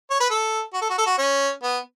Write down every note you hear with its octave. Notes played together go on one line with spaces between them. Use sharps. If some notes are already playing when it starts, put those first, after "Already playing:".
C#5
B4
A4
F#4
A4
F#4
A4
F#4
C#4
B3